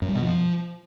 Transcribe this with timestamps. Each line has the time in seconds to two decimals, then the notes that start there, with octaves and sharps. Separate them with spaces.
0.02 F#2
0.08 G3
0.15 B2
0.22 F3